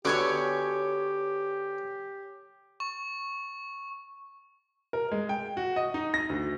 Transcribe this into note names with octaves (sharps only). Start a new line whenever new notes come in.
D3 B3 F#4 G4 C#5 G#5 D6
C#6
A#4
G#3
G5
F#4
D#5
D#4
A#6
D2